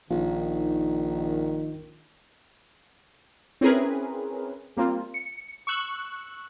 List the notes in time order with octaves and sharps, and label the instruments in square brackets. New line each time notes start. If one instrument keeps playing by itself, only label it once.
[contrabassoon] A#1 [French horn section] D#3 [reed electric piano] F4
[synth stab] C4 C#4 E4 G#4 A#4 B4
G3 A#3 C4 F4
C#7
C#6 E6 F#6